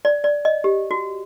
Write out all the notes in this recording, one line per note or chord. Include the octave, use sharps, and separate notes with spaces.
D5
D5
D#5
G4
F#4